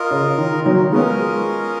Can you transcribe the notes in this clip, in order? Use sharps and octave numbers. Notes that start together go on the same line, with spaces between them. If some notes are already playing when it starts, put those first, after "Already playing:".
Already playing: F4 A#4 D#5
C#3
D#3
D#3 F#3
G#3 B3 C#4 F4 A#4 D#5